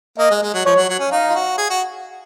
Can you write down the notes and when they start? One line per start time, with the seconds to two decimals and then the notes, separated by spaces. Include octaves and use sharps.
0.18 A#3 D#5
0.31 G#3
0.42 G#3
0.54 F#3
0.65 F3 C#5
0.76 F#3
0.89 F#3
0.99 C#4
1.11 D#4 F5
1.30 F4
1.35 F#4
1.58 G#4
1.70 F#4